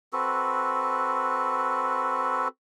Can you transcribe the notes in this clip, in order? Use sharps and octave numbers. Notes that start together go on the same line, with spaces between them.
C4 F#4 A4 B4